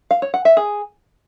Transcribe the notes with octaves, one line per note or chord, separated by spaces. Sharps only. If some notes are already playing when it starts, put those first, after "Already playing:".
F5
C#5
F#5
E5
G#4